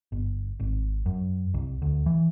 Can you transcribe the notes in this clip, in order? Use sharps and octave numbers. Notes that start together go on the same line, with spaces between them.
G1
G#1
F#2
C2
D2
E3